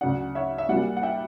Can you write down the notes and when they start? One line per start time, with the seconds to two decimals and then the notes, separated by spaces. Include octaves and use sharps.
0.01 D2 C#3 F#3 D5 F#5
0.35 C#5 E5
0.58 E5
0.69 A#2 G3 D5 F#5
0.97 F#5
1.03 E5 G5